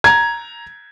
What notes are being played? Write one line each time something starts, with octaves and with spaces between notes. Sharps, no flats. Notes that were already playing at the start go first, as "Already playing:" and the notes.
A#5 G#6